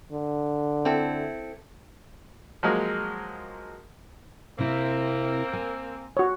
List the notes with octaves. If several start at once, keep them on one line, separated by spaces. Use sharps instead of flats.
D3
C4 E4 A4
F3 F#3 G#3 A#3
C3 A#3 C4 E4
G#5
F#4 C#5